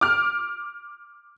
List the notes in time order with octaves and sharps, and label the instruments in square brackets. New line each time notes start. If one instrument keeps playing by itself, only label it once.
[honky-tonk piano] D6 F6